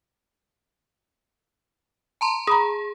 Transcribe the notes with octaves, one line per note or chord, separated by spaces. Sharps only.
A5 A#5 C6
G#4 A#5 B5 D#6